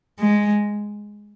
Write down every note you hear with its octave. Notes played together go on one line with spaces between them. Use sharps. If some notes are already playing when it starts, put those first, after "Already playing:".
G#3